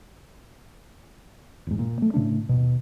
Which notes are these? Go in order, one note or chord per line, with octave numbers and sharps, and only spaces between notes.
E1 G#2
A#2
A3
A2 C#3 A3 D4
D#1 B1 B2